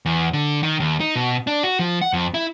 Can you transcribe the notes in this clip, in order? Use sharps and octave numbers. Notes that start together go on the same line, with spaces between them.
E2
D3
D#3
D#2
D#4
B2
D4
F#4
F3
F#5
F2
E4